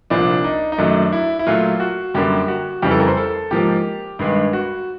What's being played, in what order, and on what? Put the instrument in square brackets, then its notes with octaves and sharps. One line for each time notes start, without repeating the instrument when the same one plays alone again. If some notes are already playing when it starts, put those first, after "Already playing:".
[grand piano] C2 A#2 F3 D4
D#4
D#4
F#2 D#3 F#3 A3 D4
E4
E4
A#2 F#3 A3 F4
F#4
F#2 D3 G3 A#3 G4
F#4
F2 C#3 E3 G3 G4
A4
A#4
C5
A4
G#2 F3 A#3 G4
G2 D#3 G#3 B3
F#4